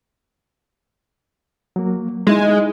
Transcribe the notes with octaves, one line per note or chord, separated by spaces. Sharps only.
F#3 A#3
G#3 D#4 E4 D#5